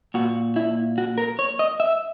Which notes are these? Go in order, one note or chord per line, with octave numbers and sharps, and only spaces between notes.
A#2 F#4
E4
F#4
A#4
C#5
D#5
E5